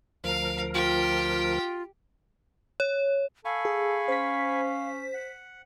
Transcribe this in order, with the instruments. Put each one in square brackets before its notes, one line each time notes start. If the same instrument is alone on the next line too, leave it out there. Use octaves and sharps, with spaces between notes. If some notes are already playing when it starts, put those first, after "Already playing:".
[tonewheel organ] D2 F3 A#4 [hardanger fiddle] F5
[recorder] F4 [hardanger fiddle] G4 G5
[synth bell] C#5
[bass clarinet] A4 [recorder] F5 [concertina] G#5 B5 C#6
[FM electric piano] G#4
[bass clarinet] C#4 [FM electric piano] C5 B6
[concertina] F#5